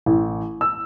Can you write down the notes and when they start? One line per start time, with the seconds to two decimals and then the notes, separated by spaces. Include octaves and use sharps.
0.06 A1
0.61 E6